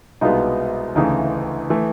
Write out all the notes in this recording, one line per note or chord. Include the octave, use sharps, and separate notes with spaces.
C2 B2 G#3 B3 D#4 F4
D2 C#3 E3 A3 D#4
E3 A3